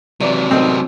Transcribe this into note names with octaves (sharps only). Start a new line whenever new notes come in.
C3 E3 F#3 D5
A2 C4 D#4 A#4